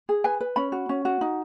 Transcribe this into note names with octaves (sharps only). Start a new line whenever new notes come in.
G#4
B4 G#5
B4
C#4 B5
F#4
C#4
F#4
D#4